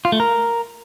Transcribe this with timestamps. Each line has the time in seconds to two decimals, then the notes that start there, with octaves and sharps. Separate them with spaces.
0.05 F4
0.12 A3
0.20 A#4